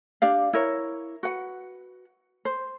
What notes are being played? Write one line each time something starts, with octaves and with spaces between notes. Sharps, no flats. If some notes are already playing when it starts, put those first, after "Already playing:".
D4 G4 D5 F5
E4 A#4 C#5
F#4 B4 F#5
C5